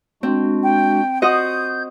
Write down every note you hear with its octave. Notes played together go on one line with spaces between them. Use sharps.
G#3 C4 D4 F#4
G5
F#4 C5 D#5 D#6 G6